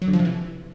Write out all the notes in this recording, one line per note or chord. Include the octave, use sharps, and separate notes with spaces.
F#3
D3
F3
C3
E3